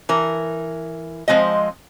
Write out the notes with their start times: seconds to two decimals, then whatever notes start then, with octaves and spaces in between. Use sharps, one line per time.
0.09 E3 A#4
1.28 F3 G#3 C4 D#5